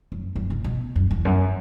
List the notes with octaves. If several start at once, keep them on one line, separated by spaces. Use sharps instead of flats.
F#2
F#2
B2
B2
F#2
E2
F#2